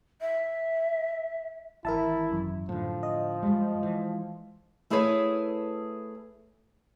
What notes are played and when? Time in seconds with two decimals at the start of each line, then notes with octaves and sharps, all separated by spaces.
0.21 E5
1.85 G#1 E3 E4 A#4 E5 A5
2.32 F#2
2.69 A2 D3 F3
3.03 D#5
3.43 G2 G3 G#3
3.83 E3
4.90 A3 E4 G#4 A#4 B4 C#5